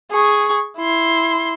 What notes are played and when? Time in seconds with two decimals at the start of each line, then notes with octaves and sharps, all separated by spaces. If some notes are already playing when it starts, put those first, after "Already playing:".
0.11 G#4 C#6
0.78 E4 C6